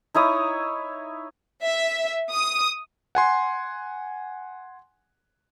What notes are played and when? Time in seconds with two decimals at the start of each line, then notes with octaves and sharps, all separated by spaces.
0.14 D#4 E4 C#5 D#6
1.63 E5
2.32 D#6
3.15 F#5 G#5 C6